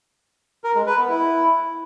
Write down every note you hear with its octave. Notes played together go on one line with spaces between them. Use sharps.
A#4
G#3
B4
B3
E4